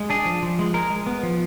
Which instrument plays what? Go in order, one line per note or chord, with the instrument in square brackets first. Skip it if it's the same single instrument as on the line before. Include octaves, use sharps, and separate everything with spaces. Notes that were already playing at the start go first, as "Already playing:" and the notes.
Already playing: [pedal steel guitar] G#3
D4 G#4
F3
F3
G#3
G#3 A#4
G#3
B3
F3